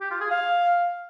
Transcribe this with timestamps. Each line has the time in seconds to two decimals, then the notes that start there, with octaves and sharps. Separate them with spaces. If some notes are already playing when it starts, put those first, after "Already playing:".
0.01 G4
0.11 F4
0.21 G#4
0.31 F5